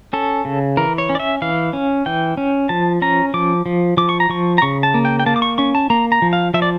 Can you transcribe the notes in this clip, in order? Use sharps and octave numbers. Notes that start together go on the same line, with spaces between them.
C#4 A4
C#3
E3 A#4
C#5
C#4
D5
E5
E3 F5
C#4
E3 G5
C#4
F3 A5
C#4 A#5
F3 D6
F3
F3 D6
C#6
A#5
F3 C#6
A#5
C#3 C#6
A5
A#3
G5
G5
A#3 A5
D6
C#6
C#4 C#6
A5
A#3 A#5
A#5
F3
F5
F3 E5
D5